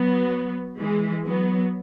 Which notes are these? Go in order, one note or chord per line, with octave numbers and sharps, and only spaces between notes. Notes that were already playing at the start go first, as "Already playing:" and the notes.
Already playing: F#3 B3
E3 G#3
F#3 B3